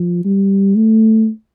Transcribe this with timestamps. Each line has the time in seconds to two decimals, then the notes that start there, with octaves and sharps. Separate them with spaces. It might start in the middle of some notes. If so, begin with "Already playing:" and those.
Already playing: F3
0.25 G3
0.76 A3